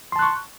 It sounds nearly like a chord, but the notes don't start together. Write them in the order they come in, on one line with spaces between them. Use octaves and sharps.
C6 A5 F#6 C#6